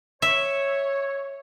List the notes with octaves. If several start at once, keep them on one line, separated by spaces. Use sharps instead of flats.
C#5 E5